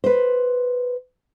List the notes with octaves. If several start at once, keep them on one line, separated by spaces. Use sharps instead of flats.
B4 C5